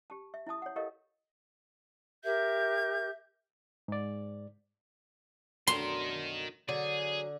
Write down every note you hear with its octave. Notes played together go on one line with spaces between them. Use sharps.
G4 A5
E5
E4 E5 A5 D#6
C#5 F#5
E4 G4 A4 A#4 D#5 F5
G4 A#4 E5 G6
G#2 D5
F#2 B2 D3 D#4 A#4 C6
D3 F#3 G#4